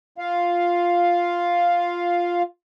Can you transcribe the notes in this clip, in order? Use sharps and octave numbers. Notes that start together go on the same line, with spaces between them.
F4 F5